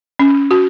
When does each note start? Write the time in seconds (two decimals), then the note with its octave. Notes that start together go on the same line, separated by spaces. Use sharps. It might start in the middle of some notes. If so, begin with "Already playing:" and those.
0.19 C#4
0.51 F#4